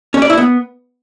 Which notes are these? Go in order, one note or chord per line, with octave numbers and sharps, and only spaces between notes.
C#4
D5
E4
B3